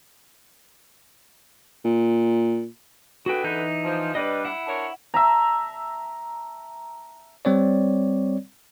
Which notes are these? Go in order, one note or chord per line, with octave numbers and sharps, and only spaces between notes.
A#2
D3 F#4 G#4 B4 G5
E3 D#4 G6
F3
G3 D4 B4 D5 D#5
E4 F#5
D4 A#4 C#5
E5 A5 A#5
G3 C4 C#5 D5